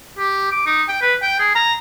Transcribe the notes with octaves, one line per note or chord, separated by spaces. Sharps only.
G4
D6
D#4
G5
B4
G5
G#4
A#5